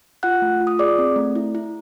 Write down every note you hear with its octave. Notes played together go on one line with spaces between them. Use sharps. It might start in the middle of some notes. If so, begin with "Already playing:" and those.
F4 F#5 F#6
A3
F4
D#6
G#4 D5 D6
C4
A3
E4
E4